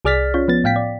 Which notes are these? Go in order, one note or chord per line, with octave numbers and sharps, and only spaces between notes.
C2 G#4 D5 F6 A6 B6
C#4 F4 C#5
F3 B3 A6
A2 F5 G5 B6
D5